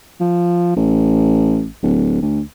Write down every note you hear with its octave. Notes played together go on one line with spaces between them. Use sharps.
F3
A1
D1
D2